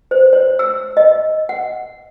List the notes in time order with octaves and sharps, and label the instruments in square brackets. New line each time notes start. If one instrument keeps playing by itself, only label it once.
[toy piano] C5
C#5
E6
D#5
F#5